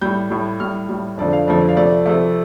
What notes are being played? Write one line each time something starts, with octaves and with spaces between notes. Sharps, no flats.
A2 G3 G6
A2 G3
A2 G3 F6
A2 G3
F2 D3 F3 A3 D5
F5
F2 D3 F3 A3 D5
D5
F5
C3 F3 A3 D5
C3 F3 A3